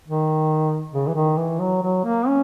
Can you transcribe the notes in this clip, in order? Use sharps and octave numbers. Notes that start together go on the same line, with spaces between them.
D#3
C#3
E3
D#3
E3
F#3
F#3
A#3
C#4